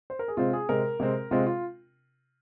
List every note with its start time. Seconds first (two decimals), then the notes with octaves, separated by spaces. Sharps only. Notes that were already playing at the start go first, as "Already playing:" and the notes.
0.10 C5
0.19 A#4
0.28 G#4
0.37 C3 G#3 C4 F4
0.53 G#4
0.69 C3 G#3 C4 A#4
1.00 C3 G#3 C4
1.31 C3 G#3 C4 F4
1.47 F4